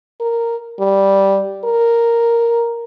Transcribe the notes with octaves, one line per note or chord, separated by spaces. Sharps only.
A#4
G3
A#4